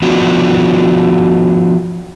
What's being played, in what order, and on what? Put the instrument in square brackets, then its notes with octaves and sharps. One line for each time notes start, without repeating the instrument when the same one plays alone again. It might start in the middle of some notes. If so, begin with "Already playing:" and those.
[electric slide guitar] F3 B3 D4 F4 F#4